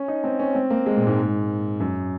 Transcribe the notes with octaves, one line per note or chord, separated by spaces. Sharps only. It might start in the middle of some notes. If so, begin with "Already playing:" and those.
Already playing: C#4
D#4
C4
C#4
C4
A#3
G#3
A#2
G#2
F#2